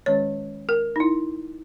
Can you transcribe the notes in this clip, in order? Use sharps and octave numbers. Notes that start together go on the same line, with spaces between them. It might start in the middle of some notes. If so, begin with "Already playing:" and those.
D#3 G#3 C#4 C#5
A#4
D#4
E4